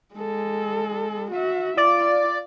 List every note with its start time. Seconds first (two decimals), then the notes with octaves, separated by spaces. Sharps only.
0.15 G#3 A4
1.31 F#4 E5
1.77 F4 D5